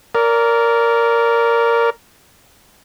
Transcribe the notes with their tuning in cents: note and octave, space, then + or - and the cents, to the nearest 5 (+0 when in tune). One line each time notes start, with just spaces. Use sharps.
A#4 +0 D5 -25